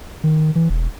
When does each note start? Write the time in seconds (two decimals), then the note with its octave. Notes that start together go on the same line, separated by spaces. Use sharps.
0.24 D#3
0.55 E3
0.70 E1